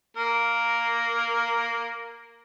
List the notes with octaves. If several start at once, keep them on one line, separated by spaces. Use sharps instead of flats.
A#3 A#4